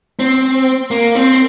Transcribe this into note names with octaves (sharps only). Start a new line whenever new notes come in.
C4
A#3
C4